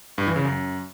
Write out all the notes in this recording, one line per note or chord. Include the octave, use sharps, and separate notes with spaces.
G2
E3
C#3
F#2